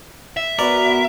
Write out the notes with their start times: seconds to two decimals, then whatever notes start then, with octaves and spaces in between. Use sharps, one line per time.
0.37 E5
0.59 B3 F#4 A#4 B4 D5